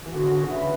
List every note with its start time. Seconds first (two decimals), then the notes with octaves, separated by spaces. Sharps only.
0.06 E3 F#4
0.15 D3
0.23 C#3
0.31 D3
0.43 D3
0.50 C#3 B4 E5